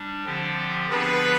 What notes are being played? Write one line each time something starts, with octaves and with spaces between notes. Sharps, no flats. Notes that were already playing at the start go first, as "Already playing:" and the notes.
Already playing: G3 D4
D3 F3 C4 G4
D3 F3 B3 D4 G#4 B4